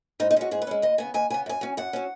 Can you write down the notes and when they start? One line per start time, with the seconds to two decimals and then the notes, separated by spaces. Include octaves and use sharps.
0.20 G#2 D#4
0.31 D#4
0.36 G#3 C#4 F#4
0.51 G#2 G#4
0.62 B4
0.67 G#3 C#4
0.82 D#2 D#5
0.98 C#3 B3 G#5
1.14 D#2 G#5
1.30 C#3 B3 G#5
1.46 F#2 G#5
1.61 F#3 C#4
1.77 F#2 F#5
1.93 F#3 C#4